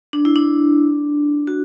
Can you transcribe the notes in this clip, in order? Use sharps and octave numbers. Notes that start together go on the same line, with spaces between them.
D4
E4
D4
F#4